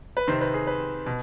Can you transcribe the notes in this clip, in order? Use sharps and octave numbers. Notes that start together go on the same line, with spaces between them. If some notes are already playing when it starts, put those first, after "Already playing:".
B4
C3 D#3 C4 C5
B4
G#4
B4
B2